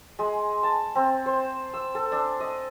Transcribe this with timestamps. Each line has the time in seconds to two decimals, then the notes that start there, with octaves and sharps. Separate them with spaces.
0.19 G#3
0.63 A5
0.95 C4
1.26 C5
1.74 E6
1.95 A4
2.12 D4
2.40 D#5